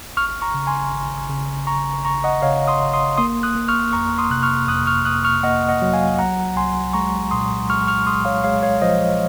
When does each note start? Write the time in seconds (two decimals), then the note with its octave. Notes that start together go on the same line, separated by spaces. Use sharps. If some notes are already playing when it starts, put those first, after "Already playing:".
0.17 G#1 C#6 F6
0.42 A#5 C#6
0.54 C#3
0.67 G#5 C6
0.93 G#1
1.29 C#3
1.67 G#1 A#5 C#6
2.05 G#1 A#5 C#6
2.24 D#5 F#5
2.42 C#3 C#5 F5
2.68 C6 D#6
2.81 G#1
2.93 C6 D#6
3.17 A#3 C6 D#6
3.43 D#6 F#6
3.55 A#3
3.68 C#6 F6
3.93 F2 A#5 C#6
4.18 C6 D#6
4.30 C3 F#6
4.43 C#6 F6
4.68 F2 D#6 F#6
4.87 C#6 F6
5.05 A#3 D#6 F#6
5.24 C#6 F6
5.43 A#3 D#5 F#5
5.69 D#5 F#5
5.82 F#3
5.93 F5 G#5
6.18 C2 F#5 A#5
6.56 C2 G#5 C6
6.93 G#3 A#5 C#6
7.31 A#2 C6 D#6
7.69 G#3 C#6 F6
7.87 C#6 F6
8.07 G#3 C6 D#6
8.25 C#5 F5
8.44 G#3 C#5 F5
8.63 C#5 F5
8.82 F3 C5 D#5